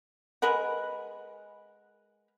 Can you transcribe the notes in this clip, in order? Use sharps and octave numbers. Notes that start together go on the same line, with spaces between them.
G#3 A#4 B4 F#5